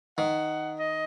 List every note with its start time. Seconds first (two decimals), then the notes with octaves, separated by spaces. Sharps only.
0.18 D#3 F#5
0.79 D#5